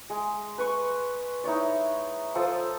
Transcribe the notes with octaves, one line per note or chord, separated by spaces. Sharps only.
G#3
B4 C#6
D#4 E4 C#5 D5
F3 A4 C5 D#6